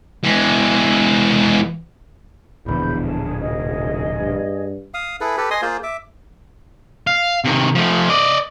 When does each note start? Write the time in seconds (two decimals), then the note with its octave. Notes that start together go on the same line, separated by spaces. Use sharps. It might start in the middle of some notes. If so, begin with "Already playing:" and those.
0.24 E3 G#3
2.66 D1 A#1 E2 D3 B5 G6
3.04 G#4 A5
3.40 F1 G#4 D#5
4.19 G2
4.94 F5 D#6
5.21 E4 G#4 A4 B4
5.37 G4 A4 B4
5.51 D#5 G#5 C6 D#6
5.62 A#3 F4 G#4 C5
5.83 E5 D6
7.07 F5
7.44 C3 D#3
7.75 F3 A3
8.09 D5 D#5